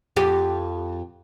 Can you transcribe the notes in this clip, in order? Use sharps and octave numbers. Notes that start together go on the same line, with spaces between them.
F2 G4